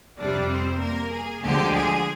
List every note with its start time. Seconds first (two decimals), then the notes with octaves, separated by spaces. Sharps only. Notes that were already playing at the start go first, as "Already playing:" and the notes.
0.19 F2 C3 G3 D4 D5
0.50 C4 C5
0.81 A#3 A#4
1.13 G#4
1.44 D2 D3 F3 G#3 G4
1.75 G#4